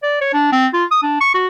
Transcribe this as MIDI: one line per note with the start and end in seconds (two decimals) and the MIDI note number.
0.03 0.19 74
0.21 0.33 73
0.34 0.50 62
0.52 0.67 60
0.74 0.84 65
0.91 1.01 87
1.03 1.20 62
1.21 1.32 85
1.34 1.48 66